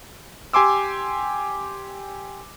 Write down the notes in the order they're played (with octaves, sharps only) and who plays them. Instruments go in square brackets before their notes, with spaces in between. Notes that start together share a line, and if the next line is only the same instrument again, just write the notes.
[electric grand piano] G4 G#5 C6 D6 E6